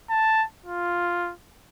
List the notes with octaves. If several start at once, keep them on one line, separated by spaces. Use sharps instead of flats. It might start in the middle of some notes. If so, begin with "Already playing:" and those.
A5
F4